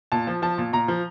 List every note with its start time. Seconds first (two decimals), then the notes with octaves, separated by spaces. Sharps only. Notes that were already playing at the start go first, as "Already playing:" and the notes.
0.12 A#2 A5
0.27 F3
0.42 F3 A5
0.58 A#2
0.73 A#2 A#5
0.88 F3